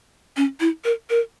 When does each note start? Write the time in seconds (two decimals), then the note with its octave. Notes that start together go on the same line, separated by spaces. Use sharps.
0.37 C#4
0.60 E4
0.84 A#4
1.10 A#4